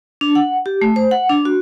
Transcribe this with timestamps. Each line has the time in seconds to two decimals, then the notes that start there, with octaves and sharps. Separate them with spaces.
0.21 D4
0.35 F#5
0.66 G4
0.81 A3
0.96 C5
1.11 F#5
1.29 D4
1.45 F#4